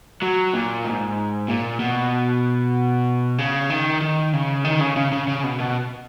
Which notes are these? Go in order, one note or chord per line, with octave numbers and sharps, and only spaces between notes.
F#3
A#2
G#2
A#2
B2
C#3
D#3
D#3
C#3
D#3
C#3
C#3
C#3
C#3
B2
B2